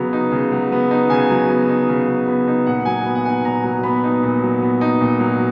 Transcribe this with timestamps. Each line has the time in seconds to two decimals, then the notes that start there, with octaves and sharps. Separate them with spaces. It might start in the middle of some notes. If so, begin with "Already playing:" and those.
Already playing: C#3 F#3 B3
0.13 D#4
0.32 C#3
0.52 F#3
0.72 B3
0.91 D#4
1.10 C#3 G#5
1.30 F#3
1.49 B3
1.69 D#4
1.89 C#3
2.07 F#3
2.27 B3
2.48 D#4
2.66 A#2 F#5
2.85 F#3 G#5
3.05 B3
3.15 F#5
3.25 D#4 G#5
3.45 A#2 A#5
3.64 F#3
3.83 B3 B5
4.04 D#4
4.23 A#2
4.42 F#3
4.62 B3
4.81 D#4
5.01 A#2
5.20 F#3